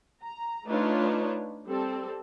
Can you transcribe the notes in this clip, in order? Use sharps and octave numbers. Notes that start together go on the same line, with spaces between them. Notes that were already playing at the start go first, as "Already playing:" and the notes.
A#5
A3 D4 D#4 F4 B4 C#5
G3 C4 A4